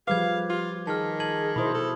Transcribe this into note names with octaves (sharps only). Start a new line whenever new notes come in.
F3 G3 G#4 B4 F5 D6 G#6
F4 G4
D#3 G#4 A5 F6
A5 G#6 F#7
B2 E4 C5 B5 D#6
A4